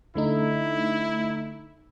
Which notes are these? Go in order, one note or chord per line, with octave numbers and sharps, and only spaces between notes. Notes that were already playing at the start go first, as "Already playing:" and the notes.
D3 A3 D#4 E4